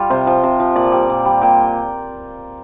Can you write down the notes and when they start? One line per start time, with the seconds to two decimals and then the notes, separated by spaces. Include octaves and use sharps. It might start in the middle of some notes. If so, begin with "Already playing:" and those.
Already playing: G3 F4
0.10 C3 C5
0.27 F3
0.43 C3
0.60 F3
0.76 A#2 D5
0.92 G3
1.09 A#2
1.25 G3
1.41 A#2 G5